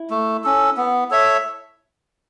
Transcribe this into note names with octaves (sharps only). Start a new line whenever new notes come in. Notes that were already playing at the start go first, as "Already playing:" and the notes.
Already playing: E4
A3
C#4 A4
B3
A4 C#5 E5